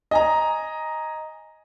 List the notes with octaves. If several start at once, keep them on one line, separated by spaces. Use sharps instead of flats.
D#5 G#5 A#5